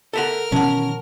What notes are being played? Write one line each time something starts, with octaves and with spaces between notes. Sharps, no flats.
A4 A#4 E5 F#5 F6
B2 D#3 E3 C#4 F#5 A5